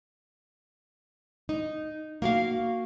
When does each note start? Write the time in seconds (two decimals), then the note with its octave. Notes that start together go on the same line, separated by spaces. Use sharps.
1.49 D#4
2.22 A#3 F#4 F5